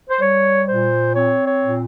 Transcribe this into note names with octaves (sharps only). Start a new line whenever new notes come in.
C5
G3 C#5
A#2 C5
C4 C#5
C#5
A#2